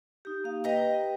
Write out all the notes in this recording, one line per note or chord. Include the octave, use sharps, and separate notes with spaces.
D#4 G4
A#3 F5
G4 B4 D#5 G5 A#5